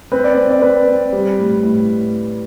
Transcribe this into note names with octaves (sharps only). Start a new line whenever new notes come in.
C4 B4
D5
C4
D5
C4 B4
C4
G3
A2
A2